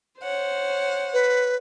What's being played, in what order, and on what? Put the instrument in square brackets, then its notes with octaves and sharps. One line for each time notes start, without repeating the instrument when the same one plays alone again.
[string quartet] C5 C#5 F#5
[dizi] B4